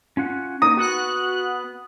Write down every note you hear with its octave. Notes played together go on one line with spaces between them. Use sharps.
C#4 F4 F#5
A#3 D#4 A#5 D#6
B3 F#4 F#6